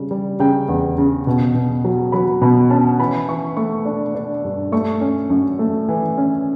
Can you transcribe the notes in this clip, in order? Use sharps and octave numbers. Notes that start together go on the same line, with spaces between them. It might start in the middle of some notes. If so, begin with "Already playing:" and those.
Already playing: C#3 G3
G3
C#3 G5
E2
C#3
B2
B2
F#3
F#3 B5
B2 B5
C#4 A5
E3 B5
E3 C#6
A3 C#6
D4
D4
G2
A3 C#6
C#4
F#2
A3
E3
C#4